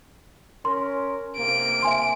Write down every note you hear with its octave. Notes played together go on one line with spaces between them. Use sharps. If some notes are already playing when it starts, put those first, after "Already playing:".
C#4 A#4 C6
C3 A#3 D7
E5 G#5 C6